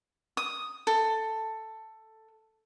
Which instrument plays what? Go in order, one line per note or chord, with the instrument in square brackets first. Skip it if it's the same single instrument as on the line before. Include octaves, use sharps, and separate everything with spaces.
[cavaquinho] D#6
A4